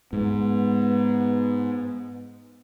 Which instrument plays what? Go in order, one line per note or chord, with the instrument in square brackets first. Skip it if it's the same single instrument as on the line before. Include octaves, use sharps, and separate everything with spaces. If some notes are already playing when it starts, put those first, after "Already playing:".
[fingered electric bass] G#2 [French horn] B3